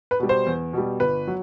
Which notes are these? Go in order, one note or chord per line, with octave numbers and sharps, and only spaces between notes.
B4
B2 G3
C5
E2
B2 G3
G1 B4
F#3